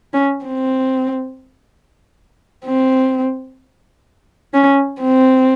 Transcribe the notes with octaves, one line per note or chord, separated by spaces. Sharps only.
C#4
C4
C4
C#4
C4